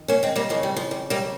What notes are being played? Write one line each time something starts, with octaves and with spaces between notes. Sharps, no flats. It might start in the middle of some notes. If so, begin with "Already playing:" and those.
Already playing: F2 D#3
A#3 C#4
G#3 C4
G3 A#3
F2 C#3 F3 G#3
G3
F3
G3
G3 A#3